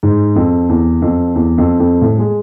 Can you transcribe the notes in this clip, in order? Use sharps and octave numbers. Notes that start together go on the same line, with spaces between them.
G#2
F2
E2
F2
E2
F2
F2
A2
G#3